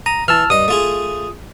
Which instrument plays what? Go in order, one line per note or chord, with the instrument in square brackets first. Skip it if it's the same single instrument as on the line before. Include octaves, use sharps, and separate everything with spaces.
[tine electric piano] A#5 [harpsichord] D#6
[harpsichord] E3 [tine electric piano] A5 E6 F6
[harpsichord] G2 D#5 [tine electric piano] D#6
[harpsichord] A3 F4 G#4